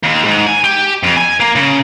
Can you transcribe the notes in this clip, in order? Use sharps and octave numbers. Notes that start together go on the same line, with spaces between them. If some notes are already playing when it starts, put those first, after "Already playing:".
D#2
G#2
G#5
G4
F2
G#5
A#3
C#3